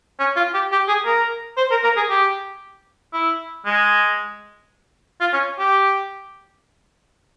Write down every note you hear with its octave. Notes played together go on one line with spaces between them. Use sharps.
C#4
F4
G4
G4
G#4
A#4
C5
A#4
A#4
G#4
G4
E4
G#3
F4
C#4
G4